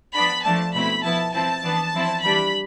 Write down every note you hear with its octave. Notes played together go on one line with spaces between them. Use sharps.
F3 B3 D4 B5
F3 A3 D4 A5
B2 A3 C4 E4 B5
F3 B3 E4 A5
F3 C4 E4 A5
E3 B3 D4
F3 C4 E4
E3 G3 D4 B5